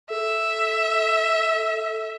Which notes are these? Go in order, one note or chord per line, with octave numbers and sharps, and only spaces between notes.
A4 E5